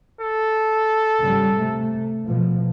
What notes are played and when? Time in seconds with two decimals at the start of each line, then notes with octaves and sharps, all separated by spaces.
0.21 A4
1.21 G#1 C#3 G3
1.59 C3 A3
2.25 B2 F3